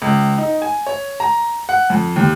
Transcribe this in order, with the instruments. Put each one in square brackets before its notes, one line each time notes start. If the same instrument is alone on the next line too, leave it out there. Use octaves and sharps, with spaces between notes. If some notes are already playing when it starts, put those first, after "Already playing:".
[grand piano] C#2
D#4
G#5
C#5
A#5
F#5
F2
D#2